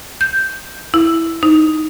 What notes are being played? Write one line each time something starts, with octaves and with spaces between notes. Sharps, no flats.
G6
E4
D#4